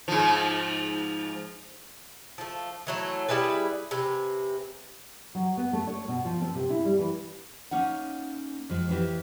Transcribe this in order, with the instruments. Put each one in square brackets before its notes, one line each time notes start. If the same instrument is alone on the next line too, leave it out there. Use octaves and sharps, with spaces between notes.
[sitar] G#2 F3
[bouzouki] F3 A3
E3 F#3 A3
G3 E4 G#4 B4
C3 B4 G#5
[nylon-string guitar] F#3
B3
A3
C#5
B2
F3
C4
C3
E4
G3
E3
A#3 C#4 D#4 F#5
F2 F3 G#3
F2 E3 G4